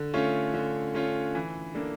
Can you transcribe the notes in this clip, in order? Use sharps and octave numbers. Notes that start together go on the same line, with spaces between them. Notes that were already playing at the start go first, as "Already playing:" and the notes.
Already playing: D3
A3 C#4 F4 C#5
D3
A3 C#4 F4 C#5
E3
A#3 D4 A4